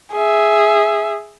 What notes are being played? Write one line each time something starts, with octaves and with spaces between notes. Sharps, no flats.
G#4 E5